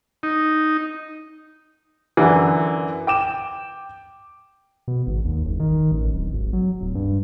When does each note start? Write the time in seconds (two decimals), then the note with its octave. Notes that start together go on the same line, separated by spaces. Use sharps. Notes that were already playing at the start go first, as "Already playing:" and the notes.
0.23 D#4
2.17 F#2 D3 E3
3.07 G5 D6 E7
4.88 B2
5.07 G#1
5.25 D#2
5.45 F#1
5.60 D#3
5.92 A1
6.14 D1
6.33 G#1
6.53 F#3
6.81 D1
6.95 G2